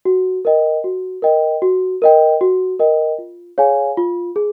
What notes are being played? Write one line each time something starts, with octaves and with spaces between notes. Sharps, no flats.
F#4
A#4 D#5 G5
F#4
A#4 D#5 G5
F#4
A#4 D#5 G5
F#4
A#4 D#5 G5
F4
G#4 C#5 F5 G#5
F4
G#4